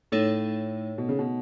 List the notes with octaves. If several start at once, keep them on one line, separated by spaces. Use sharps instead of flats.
A2 A3 D#4 A4 C#5
B2
C#3
B2